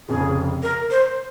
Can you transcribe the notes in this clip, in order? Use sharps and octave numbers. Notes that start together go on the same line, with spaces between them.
F1 F2 C#3 G#4
A#4
C5